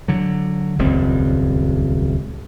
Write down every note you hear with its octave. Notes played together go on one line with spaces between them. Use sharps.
D3 F#3
D#1 C#2 F#2 C4